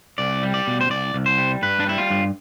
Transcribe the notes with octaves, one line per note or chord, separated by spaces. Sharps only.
C2 D5
G3
D5
B2
C5
C2 D5
C2
C5
G3
G2 B4
D4
G3 E4
F4
G2